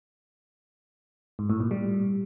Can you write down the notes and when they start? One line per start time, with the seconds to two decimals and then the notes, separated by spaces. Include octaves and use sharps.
1.39 G#2
1.50 A2
1.60 A#2
1.71 G3